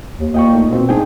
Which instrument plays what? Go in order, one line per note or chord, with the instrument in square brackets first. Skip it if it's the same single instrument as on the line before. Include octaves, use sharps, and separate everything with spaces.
[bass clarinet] D#2
[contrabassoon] A#2 [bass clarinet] A#3 [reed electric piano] D#5 G5 C#6
[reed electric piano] A3 D#4
[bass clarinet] B2 [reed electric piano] B3 C4
[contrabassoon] G#2 [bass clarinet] D4 [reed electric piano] G#4 G5